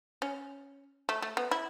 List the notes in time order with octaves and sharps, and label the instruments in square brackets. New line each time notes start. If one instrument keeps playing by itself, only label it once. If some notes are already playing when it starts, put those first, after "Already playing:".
[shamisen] C#4
A3
A3
B3
E4